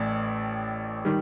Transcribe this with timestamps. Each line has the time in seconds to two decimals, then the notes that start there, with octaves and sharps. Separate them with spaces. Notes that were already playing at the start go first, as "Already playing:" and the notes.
Already playing: A1 A2 D5
1.05 D#3 G3